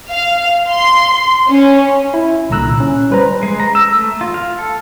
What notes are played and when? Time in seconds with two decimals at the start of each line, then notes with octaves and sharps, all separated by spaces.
0.11 F5
0.70 C6
1.49 C#4
2.14 E4
2.50 C2 A#2 D3 A#5 E6 F#6
2.80 C#4
3.11 G3 B4 C5 A#5
3.43 G#3
3.60 A#5
3.75 E6
3.89 A3
4.21 F4
4.34 F5
4.59 A4